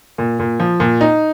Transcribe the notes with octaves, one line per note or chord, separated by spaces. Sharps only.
A#2
A#2
F3
A#2
D#4